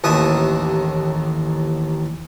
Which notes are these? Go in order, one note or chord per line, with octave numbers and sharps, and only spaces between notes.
A1 D#2 E5 D#6